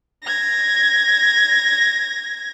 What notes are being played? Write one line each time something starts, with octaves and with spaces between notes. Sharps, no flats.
G#6 A#6